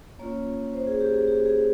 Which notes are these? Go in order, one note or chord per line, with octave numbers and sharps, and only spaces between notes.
A#3 C#4 F4 C#5
C5
G#4
G4
G#4
G4
G#4